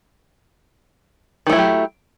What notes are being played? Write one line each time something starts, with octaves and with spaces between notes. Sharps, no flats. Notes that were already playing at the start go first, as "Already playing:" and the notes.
D#3 F#3 A3 E4 G4